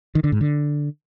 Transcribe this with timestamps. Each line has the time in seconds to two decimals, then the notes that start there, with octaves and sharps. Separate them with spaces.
0.15 D#3
0.24 D3
0.32 G#2
0.41 D3